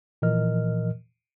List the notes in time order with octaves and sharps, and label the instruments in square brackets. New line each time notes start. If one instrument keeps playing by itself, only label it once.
[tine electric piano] A#2 E3 F3 A#4 D#5 F6